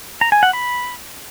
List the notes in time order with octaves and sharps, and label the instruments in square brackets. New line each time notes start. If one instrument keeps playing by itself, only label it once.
[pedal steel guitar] A#5
G#5
F#5
B5